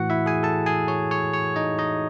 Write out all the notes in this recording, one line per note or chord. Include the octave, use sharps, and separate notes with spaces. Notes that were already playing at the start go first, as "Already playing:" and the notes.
Already playing: A2 E3 F#4 F#5
E4 E5
G#4 G#5
A4 A5
G#4 G#5
C#5
C#5
C#5
D#4 D#5
D#4 D#5